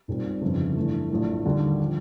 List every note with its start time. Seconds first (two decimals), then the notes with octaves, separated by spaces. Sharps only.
0.08 B1 A#2 G3 C4
0.42 G1 F2 C#3
0.76 G2 E3 A3
1.10 A#1 A2 F#3 A3
1.46 D#2 D3 G3
1.82 F3